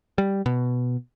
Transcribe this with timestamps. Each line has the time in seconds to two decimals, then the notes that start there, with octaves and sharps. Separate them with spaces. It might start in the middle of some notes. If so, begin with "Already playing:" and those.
0.18 G3
0.46 B2